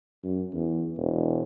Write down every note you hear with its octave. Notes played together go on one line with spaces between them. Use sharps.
F#2
E2
E1